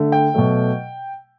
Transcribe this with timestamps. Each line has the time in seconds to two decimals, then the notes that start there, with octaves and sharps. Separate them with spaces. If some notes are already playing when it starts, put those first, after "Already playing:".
Already playing: D3 A3
0.12 G5
0.34 B2 F#3 A3